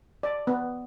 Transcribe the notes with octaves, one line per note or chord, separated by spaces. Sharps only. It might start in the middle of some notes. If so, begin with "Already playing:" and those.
D5
B3